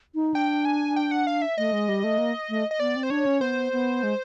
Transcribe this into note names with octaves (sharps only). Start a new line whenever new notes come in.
D#4
D4 G5
G#5
G5
F#5
F5
E5
A3 D#5
G#3
G3
A3
A#3
A3
D#5
B3 D5
C4
C5
D4 C#5
C#4
B3 C5
B3
G#3